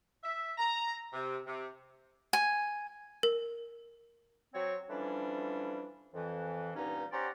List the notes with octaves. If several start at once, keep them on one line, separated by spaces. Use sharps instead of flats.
E5
A#5
C3
C3
G#5
A#4
F#3 C4 C#5
D3 E3 F3 G3 C#4 D4
F2 E3
G2 A#2 B3 C#4 D#4
C#4 G4 C5 D5 F#5 A#5